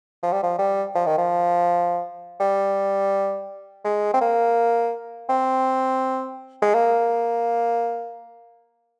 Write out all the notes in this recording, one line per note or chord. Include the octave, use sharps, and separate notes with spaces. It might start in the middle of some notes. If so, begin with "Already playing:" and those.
F3
G3
F3
G3
F3
D#3
F3
G3
G#3
C4
A#3
C4
G#3
A#3